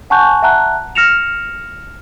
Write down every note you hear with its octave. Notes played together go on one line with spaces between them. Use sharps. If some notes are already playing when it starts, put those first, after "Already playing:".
F#5 G#5 A5 C#6 F#6 G6
E5 F#5 A5 A#5 F#6
F6 A#6 C#7 E7 F7